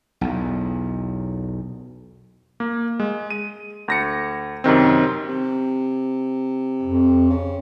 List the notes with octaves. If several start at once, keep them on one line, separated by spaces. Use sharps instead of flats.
B1 E2
A#3
G#3
D#7
D2 A#6 C#7
F#2 C3 D#3 C4
C3
F2
C#3